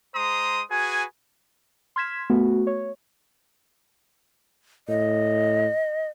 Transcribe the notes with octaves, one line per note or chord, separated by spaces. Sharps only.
G#3 C5 A#5 C6 D#6
F#4 G#4 B4 G#5
C6 F6 G#6 B6 E7
A3 B3 F#4
C#5
A2 D#5